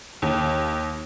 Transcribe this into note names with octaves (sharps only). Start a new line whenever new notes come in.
D#2